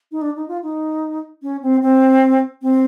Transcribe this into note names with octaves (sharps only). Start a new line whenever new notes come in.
D#4
D4
D#4
F4
D#4
C#4
C4
C4
C4